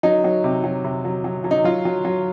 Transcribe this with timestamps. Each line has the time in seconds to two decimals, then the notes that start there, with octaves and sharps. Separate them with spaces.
0.03 F#3 D#4
0.24 F#3
0.44 C3
0.64 F#3
0.84 C3
1.05 F#3
1.24 F#3
1.44 F#3
1.51 D#4
1.64 F#3 F4
1.85 F#3
2.05 F#3